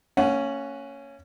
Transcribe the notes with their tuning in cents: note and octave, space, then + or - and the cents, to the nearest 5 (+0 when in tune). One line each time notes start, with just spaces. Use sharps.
A#3 -35 C#4 +0 F#5 +0